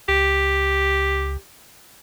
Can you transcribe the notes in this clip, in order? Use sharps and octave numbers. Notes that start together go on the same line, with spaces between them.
C#2 G4